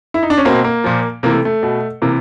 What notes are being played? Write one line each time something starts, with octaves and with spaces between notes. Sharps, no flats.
E4
D#4
D4
C#4
B2 A#3 C4
A#3
A#2 F3
C3 E3 A#3
A3
A3
B2
C3 E3 A#3